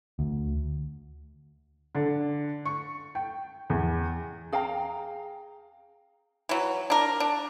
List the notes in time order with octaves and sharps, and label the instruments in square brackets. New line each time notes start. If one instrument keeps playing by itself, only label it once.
[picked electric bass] D2
[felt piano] D3
C#6
G5
E2
[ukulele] G#4 F5 G5 A#5
[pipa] E3 F#3
D4 A#4
D4